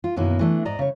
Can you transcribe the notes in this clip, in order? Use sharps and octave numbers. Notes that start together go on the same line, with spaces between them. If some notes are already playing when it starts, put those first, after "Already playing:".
F4
F#2 B2 D#3 A#3 B3 E4
E3 A3 D4
G#2 D5 D#5 A#5
C#3 C#5